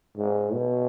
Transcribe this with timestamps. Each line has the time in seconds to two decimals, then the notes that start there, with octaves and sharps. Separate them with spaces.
0.18 G#2
0.54 B2